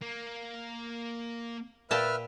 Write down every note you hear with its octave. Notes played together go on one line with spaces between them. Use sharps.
A#3
A#2 B4 E5 G5 A5 F6